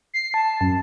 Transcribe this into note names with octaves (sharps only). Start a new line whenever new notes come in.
C7
A5
F#2